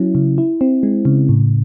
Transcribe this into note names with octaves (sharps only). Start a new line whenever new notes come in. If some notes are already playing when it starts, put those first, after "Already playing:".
Already playing: F#3 C#4 E4
C#3
E4
C4
G#3
C#3
A2